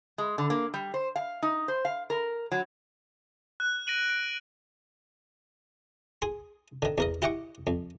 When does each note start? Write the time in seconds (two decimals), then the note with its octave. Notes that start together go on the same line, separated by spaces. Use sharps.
0.18 G#3
0.38 D3
0.50 A#3
0.74 G3
0.94 C5
1.16 F5
1.42 D#4
1.68 C5
1.85 F5
2.10 A#4
2.52 F#3
3.60 F#6
3.87 A#6 D7 D#7 F#7
4.10 D7
6.22 G#4 C6
6.82 D3 D#3
6.98 E2 A#4 D#5
7.22 E4 G4 D#5 F#5 G5 C#6
7.67 F2